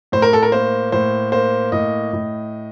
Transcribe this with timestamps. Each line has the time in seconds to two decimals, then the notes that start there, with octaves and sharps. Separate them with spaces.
0.12 A2 C5
0.22 A#4
0.33 A4
0.42 A#4
0.52 A#3 C5
0.92 A2 C5
1.32 A#3 C5
1.72 A2 D#5
2.13 A2